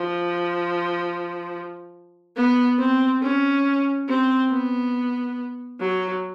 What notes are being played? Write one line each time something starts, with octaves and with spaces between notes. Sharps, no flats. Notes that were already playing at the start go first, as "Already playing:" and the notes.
Already playing: F3
B3
C4
C#4
C4
B3
F#3